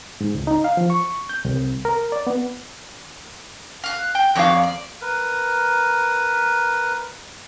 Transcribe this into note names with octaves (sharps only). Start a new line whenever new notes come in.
G#2
C#2
D#4
F5
F3
C#6
G6
C2
A#4
D5
B3
F5 F#6
G5
F2 F#4 C#5 D5 F5
D5
A#4 B4